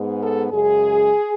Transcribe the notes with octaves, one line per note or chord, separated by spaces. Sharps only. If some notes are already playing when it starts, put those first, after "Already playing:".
Already playing: G#2 G#3 B3
A4
F#2 C#3 G#3 G#4